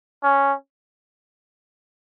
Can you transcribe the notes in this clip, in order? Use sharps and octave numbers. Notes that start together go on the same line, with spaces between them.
C#4